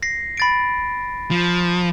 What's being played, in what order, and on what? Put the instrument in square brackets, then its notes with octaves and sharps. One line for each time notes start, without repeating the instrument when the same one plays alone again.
[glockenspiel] A#6 C7
B5 A6 D7
[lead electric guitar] F3